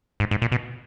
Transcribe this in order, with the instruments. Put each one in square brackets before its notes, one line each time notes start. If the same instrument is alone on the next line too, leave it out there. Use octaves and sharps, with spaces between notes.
[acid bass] G#2
G#2
A#2
B2